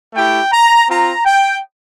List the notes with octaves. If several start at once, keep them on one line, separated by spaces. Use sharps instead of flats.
A3 E4 G4 G5
A#5
C4 F4 A#5
G5